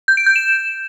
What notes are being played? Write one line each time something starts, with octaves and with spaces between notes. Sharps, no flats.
G6
D7
G6
E7